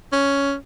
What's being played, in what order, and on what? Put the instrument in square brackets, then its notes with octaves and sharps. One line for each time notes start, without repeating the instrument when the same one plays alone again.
[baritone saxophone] C#4